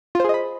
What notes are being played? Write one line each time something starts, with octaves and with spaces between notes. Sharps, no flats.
F4 G#4 C5 D#5 B5